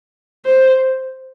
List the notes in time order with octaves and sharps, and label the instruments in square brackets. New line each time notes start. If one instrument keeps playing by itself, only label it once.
[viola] C5